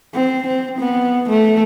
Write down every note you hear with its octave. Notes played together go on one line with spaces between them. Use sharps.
C4
C4
B3
A3